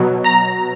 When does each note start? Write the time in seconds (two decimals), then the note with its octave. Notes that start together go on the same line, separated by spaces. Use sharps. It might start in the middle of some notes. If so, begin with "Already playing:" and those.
Already playing: B2 F#3
0.24 A#5